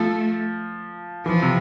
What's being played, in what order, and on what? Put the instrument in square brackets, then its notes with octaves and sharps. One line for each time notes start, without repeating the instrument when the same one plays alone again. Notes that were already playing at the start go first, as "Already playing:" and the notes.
Already playing: [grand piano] F3 [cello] A3
[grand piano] E3 [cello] F3
[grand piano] C3